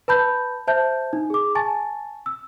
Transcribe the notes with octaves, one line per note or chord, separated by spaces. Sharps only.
B4 A5 B5 G6
C5 E5 A5 G6
D#4
G#4 D6
G#5 A5 C#6 A6
E6